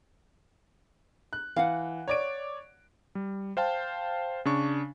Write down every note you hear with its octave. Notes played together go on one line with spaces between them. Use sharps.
F#6
E3 F5 F#5
C#5 D5 D7
G3
C5 F5 G5 A5
C#3 D4 C#6